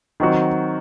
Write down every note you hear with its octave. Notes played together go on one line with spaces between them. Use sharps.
D#3 F#3 C4 F#4